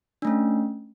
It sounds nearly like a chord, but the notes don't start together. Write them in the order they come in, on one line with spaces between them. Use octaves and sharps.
D4 A3 C#4